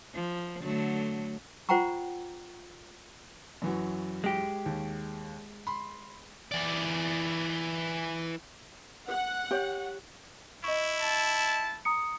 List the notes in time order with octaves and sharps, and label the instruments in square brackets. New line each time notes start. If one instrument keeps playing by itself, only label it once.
[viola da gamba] F3
D3 F#3 A3
[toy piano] F4 C5 F#5 G5 A#5 C#6
[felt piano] F#2 E3 F#3
[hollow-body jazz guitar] G#3 G4
[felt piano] D#2
B5 C6
[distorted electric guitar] E3 D5
[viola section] F#5
[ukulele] G4 C#5
[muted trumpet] E4 [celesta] D#5 C#6
[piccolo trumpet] A5
[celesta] A#5 D#6 C#7